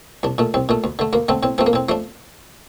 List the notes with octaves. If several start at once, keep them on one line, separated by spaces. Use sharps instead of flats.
C2 D4
A#2 A3
C2 C4
A#2 A3
D2
D3 A3
D2 A#3
D3 A3 C4
A2 C4
F3 A3 C4
A#3
A2 C4
F3 A3 D4